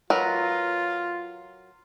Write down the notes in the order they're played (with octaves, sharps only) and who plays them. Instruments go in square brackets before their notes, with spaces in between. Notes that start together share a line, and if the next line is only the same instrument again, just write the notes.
[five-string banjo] F#3 A#4 B4 [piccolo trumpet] F4